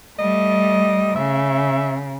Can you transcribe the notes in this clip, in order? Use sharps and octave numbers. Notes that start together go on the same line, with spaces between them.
G3 A3 D#5
C#3 E5